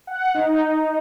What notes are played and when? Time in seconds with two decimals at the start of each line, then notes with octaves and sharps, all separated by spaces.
0.07 F#5
0.34 D#4